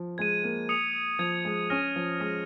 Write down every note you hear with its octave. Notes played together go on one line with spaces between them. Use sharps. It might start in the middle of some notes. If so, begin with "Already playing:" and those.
Already playing: F3
G#3 G#6 D#7
A#3
D#6 C#7 F7
F3 G#6 F7
G#3
C#4 F6 A#6 D#7
F3
G#3 D#6 A#6 D#7